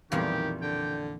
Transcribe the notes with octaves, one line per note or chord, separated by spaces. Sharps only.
B1 F2 A#2 D#3 E3 G3 G4 F5
D3 G5